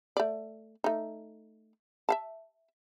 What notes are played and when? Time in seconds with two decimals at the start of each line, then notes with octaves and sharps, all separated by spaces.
0.17 A3 D5
0.84 A3 D#4
2.09 E5 F5 A5